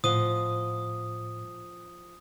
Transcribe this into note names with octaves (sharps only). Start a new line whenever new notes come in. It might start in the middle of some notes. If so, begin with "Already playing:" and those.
A2 F3 D#5 F#5 D#6